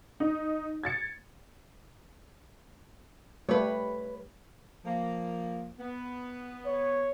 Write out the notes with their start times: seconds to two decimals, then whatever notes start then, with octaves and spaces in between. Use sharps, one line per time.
0.20 D#4
0.84 G#6 A6 C#7
3.49 G3 A3 B4 C#5
4.85 F3 A#3
5.79 B3
6.66 C#5